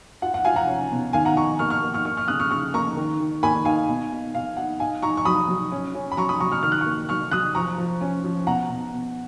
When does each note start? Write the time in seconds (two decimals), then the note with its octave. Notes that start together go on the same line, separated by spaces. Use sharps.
0.22 F4 F#5
0.34 F#5
0.45 F4 F5 G#5
0.56 F#5 A#5
0.68 C#4
0.91 B2
1.13 D#3 F5 G#5
1.25 F#5 A#5
1.36 D#4 A#5 C#6
1.59 A#3 C#6 F6
1.70 C#6 F6
1.83 A#3
1.94 C#6 F6
2.05 A#3 C#6 F6
2.17 C#6 F6
2.28 C#3 D#6 F#6
2.40 C#6 F6
2.51 C#3 C#6 F6
2.74 A#3 A#5 C#6
2.97 D#3
3.20 D#3
3.43 A#3 G#5 B5
3.65 D#4 F5 G#5
3.89 B2
4.12 D#4
4.34 B2 F5
4.57 D#4 F#5
4.80 D#4 F5 G#5
5.02 D#4 A#5 C#6
5.17 C#6
5.25 F#3 B5 D#6
5.48 F#3
5.72 C#4
5.94 C#4
6.12 B5
6.17 F#3 A#5 C#6
6.29 B5 D#6
6.40 F#3 A#5 C#6
6.52 C#6 F6
6.63 D#3 F6
6.72 F#6
6.81 C#6 F6
6.86 A#3
7.09 F#3 C#6 F6
7.31 F#3 D#6 F#6
7.55 F3 A#5 C#6
7.78 F3
8.01 C#4
8.24 F3
8.47 B2 F#5 A#5
8.69 B2
8.93 B2